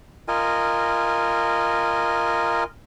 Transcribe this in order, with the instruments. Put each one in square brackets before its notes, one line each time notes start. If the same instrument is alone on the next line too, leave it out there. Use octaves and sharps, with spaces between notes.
[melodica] F4 A#4 D#5 G#5